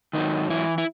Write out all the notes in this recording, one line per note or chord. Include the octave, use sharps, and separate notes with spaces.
G#2 D#3 F#3 D#4
E3 E4
E4